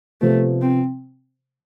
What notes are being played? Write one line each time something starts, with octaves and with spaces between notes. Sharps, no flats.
C3 F3 A3 B3
C4